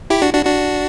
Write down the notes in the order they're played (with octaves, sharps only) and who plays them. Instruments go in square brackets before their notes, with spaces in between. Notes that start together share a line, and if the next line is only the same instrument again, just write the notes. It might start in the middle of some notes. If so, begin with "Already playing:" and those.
[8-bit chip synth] E4 G4
D4 F#4
D4 F#4
D4 F#4